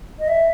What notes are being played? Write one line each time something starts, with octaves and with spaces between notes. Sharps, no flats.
D#5
E5